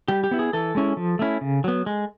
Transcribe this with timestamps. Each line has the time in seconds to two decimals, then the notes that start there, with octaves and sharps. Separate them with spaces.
0.08 G3 G4
0.24 G4
0.31 B3 E4
0.39 G#4
0.53 E3 A4
0.75 G#3 C#4 E4
0.97 F3
1.19 A3 C#4 E4
1.41 C#3
1.64 F#3 B3
1.86 G#3